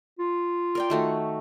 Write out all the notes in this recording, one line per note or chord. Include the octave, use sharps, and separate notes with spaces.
F4
A#4 D5 G5
D#3 A3 F#4